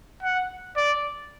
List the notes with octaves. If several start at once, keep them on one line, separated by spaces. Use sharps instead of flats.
F#5
D5